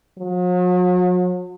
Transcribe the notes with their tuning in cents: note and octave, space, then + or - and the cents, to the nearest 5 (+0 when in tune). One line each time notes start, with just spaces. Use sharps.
F#3 -45